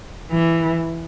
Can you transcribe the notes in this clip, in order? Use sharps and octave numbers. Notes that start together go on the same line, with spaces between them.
E3